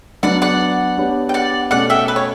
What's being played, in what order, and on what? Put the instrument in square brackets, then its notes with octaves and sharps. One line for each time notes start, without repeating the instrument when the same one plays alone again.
[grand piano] F#3 B3 D4 [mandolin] D5 F#5
[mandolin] D5 F#5
[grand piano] B3 D4 G4 C#5
[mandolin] G5
D5 F#5
[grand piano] B2 A3 C#4 [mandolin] D5 F#5
[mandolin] E5 G5
B4
C#5